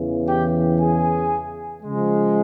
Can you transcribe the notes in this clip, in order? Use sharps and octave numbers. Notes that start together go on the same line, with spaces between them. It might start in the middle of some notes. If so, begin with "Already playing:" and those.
Already playing: E2 C#3 E3
G4 G5
G#4 G#5
C#3 F3 G#3